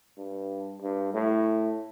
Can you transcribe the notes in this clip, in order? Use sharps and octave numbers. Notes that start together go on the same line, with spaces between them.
G2
G2
A2